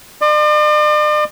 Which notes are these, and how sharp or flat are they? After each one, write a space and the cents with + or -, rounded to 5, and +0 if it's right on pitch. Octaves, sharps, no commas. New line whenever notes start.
D5 +45 C6 +0